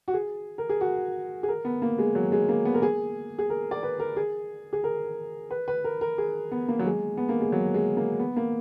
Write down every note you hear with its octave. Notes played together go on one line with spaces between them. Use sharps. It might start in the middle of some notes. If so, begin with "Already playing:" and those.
F#4
G#4
A#4
G#4
F#4
G#4
A#4
B3
A#3
G#3
F#3
G#3
A#3
B3
A#4
G#4
G#4
A#4
D5
B4
A#4
G#4
G#4
A#4
B4
B4
A#4
A#4
G#4
B3
A#3
F#3
G#3
B3
A#3
G#3
F#3
G#3
A#3
B3
A#3